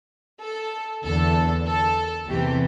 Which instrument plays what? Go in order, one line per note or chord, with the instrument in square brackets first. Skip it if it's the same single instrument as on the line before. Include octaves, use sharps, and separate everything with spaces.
[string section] A4
E2 D3 A4
A4
E2 C3 E3 G4